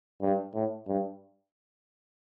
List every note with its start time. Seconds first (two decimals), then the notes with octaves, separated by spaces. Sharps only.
0.22 G2
0.55 A2
0.88 G2